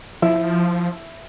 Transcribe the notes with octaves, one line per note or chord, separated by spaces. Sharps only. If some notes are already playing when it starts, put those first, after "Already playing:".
F3 E4